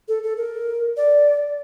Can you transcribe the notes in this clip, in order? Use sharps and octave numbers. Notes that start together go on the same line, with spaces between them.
A4
A4
A#4
D5